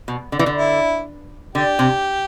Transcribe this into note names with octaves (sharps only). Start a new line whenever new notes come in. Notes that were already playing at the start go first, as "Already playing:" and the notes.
B2
D3
E3
D3
E4
D3 G4
C3